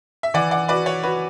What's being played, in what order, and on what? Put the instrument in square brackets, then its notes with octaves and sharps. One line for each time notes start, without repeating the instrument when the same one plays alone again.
[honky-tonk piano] E5
[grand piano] E3 [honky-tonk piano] D5 F#5
[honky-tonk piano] D5 F#5
[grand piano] F#4 [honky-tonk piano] B4 D5
[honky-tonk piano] C#5
[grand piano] F#4 [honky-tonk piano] B4